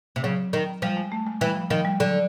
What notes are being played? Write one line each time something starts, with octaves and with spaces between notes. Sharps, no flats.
C3
C#3 F#3
D#3
F3 G3
G#3
A3
G#3
E3 G3
F3
D#3 F3
G3
D3 F#3